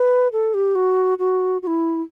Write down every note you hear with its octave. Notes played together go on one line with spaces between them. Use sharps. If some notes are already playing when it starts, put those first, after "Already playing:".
Already playing: B4
A4
G4
F#4
F#4
F#4
E4